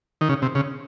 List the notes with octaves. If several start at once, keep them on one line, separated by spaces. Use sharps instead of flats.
D#3
C#3
C3
C#3